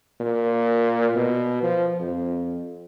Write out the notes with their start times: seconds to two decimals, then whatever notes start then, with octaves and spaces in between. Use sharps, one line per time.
0.20 A#2
1.16 B2
1.63 F3
2.00 F2